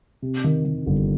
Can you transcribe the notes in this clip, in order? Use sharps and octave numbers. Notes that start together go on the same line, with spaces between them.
C3
D#3
D#3
G1